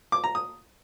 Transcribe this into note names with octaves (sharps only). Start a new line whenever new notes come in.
D6
A#5
D#6